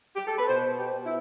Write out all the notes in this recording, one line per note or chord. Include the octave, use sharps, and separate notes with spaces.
G4
A4
B4
B2 C5
G4
B2
E4